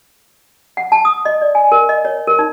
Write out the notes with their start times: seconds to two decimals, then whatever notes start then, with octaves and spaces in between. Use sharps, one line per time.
0.77 F#5
0.92 A5
1.05 D#6
1.25 D#5
1.42 D5
1.55 G#5
1.72 A#4
1.89 D#5
2.05 C#5
2.27 A#4
2.39 D#4